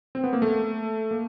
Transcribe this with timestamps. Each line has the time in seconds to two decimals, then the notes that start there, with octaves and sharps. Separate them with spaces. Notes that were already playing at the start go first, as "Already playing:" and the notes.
0.15 C4
0.24 B3
0.33 A#3
0.42 A3
1.11 A#3